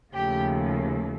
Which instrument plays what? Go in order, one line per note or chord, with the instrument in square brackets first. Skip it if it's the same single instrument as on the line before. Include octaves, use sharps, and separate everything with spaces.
[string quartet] D#2 C#3 F3 A3 G4